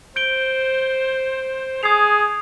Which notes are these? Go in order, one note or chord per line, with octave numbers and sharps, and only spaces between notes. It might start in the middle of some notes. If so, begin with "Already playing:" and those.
C5 G6 D7 G7
G#4 D#6 G#6 C7 F7